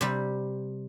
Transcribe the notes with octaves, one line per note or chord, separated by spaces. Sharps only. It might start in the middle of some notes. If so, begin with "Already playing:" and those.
C3 G3